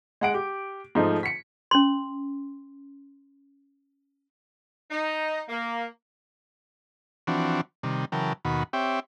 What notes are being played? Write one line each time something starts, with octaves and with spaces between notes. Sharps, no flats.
G#3 F#5 D7
G4
G#2 F3 A3 D#4
B6 C#7
C#4 C6
D#4
A#3
E3 F3 C4 D4 F#4
C3 D#3 G3
C#3 E3 F#3 A#4 G5 A5
D#2 B2 D#3 F#4 B5
C4 G4 C#5 E5 G5